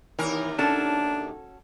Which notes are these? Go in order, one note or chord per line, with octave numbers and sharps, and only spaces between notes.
D#2 C3 E3 A#4
C#4 D4 F#4 A4